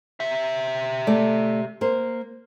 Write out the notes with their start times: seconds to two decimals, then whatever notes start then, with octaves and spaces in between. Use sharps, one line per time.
0.20 G4 E5
1.07 A3 D5
1.81 A#3 C5